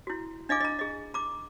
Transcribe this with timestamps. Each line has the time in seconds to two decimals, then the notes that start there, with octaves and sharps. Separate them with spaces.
0.07 E4 F#4
0.49 D4 D#5 F5 G#5 D6
0.60 D#5 A#5
0.79 G#4 D#5
1.14 A#5 D6